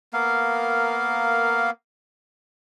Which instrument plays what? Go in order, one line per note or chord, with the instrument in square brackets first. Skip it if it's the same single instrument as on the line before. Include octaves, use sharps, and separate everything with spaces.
[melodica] A#3 B3 A#4 F5